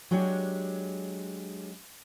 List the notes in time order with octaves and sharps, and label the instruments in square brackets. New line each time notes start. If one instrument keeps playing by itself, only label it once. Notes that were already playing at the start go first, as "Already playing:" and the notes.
[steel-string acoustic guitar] F#3 G#3 D4 G4 C#5